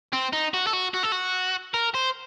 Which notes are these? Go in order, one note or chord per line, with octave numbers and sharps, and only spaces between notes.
C4
D#4
F#4
A4
F#4
F#4
A4
F#4
A#4
C5